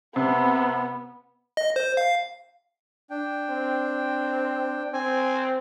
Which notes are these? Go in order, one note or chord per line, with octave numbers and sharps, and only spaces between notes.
C3 B3
D#5
C5
F5
D4 G5
C4
C4 G#5